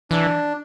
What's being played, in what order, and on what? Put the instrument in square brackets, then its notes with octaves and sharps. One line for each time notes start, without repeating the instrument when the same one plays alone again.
[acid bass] E3 [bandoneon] D4